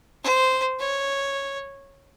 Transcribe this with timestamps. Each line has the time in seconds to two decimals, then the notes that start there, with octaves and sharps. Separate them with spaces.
0.24 C5
0.79 C#5